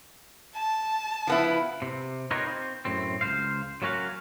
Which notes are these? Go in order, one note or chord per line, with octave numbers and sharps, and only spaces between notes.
A5
F3 B3 E4
C3
D#4 F4 G4 A#4 B4 C#5
C4
F#2 A2 C4
C#2 C5 F5
F#3 A#3 C#4 F#4 F5